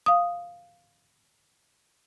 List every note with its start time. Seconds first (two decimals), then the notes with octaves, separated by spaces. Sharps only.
0.06 F5 D#6